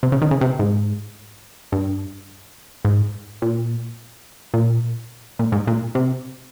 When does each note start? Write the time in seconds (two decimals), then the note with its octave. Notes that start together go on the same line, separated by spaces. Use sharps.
0.03 C3
0.12 C#3
0.22 D#3
0.31 C#3
0.41 C3
0.59 G#2
1.72 G2
2.85 G#2
3.42 A#2
4.54 A#2
5.39 A#2
5.52 G#2
5.67 A#2
5.95 C3